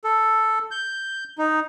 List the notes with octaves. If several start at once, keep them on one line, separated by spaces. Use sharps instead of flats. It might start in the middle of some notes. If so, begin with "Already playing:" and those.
A4
G6
D#4